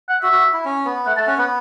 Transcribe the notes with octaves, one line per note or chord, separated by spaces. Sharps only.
F#5
F#4 E5
F#4
E4
C#4
B3
A3 F#5
A3 A5
C#4 F#5
B3 F#5